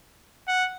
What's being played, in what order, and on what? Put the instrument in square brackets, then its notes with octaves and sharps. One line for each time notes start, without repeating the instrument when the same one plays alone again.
[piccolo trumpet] F#5